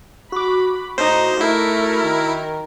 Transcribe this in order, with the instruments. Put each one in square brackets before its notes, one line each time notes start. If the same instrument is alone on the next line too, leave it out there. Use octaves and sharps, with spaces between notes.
[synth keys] F#4 D6 [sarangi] B5
[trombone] A2 [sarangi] D#4 [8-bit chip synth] C5
[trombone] A3 [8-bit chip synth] E4 [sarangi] A#4
[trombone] D#3